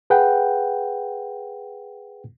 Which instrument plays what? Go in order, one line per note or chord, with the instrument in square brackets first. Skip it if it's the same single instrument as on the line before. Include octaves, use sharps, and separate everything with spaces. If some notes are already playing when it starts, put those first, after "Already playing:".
[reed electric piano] G#4 B4 F#5 G5